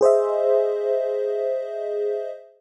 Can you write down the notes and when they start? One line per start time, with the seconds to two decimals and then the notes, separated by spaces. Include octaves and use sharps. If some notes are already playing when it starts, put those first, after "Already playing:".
0.01 G#4 C5 D#5 E5